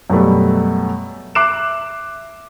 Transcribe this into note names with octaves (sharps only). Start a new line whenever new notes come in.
F#2 B2 G3 A3
E5 D6 F#6 C7 D7 E7